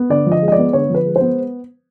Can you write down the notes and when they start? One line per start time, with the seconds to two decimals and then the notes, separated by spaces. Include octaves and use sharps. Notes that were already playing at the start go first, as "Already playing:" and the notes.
Already playing: B3
0.10 D3 D5
0.26 F3
0.32 D#5
0.42 G#3
0.48 D#5
0.52 D5
0.58 B3
0.73 D3 C#5
0.90 F3 B4
1.05 G#3
1.16 C5
1.21 B3